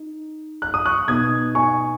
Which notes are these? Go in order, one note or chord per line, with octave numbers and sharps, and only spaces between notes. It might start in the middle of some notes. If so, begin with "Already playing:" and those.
Already playing: D#4
F#6
D#6
C#6 F#6
B2 B3 D#4 D#6 G#6
G#5 C#6